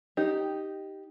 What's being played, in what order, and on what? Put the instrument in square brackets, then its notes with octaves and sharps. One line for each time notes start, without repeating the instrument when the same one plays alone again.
[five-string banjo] D#4 G4